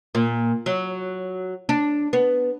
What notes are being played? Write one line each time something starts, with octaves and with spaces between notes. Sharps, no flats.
A#2
F#3
D4
B3